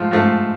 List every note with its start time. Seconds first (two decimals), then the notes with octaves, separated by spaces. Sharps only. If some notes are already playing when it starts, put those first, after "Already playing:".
Already playing: G#2 F3 A3 F4
0.11 G#2 F3 A3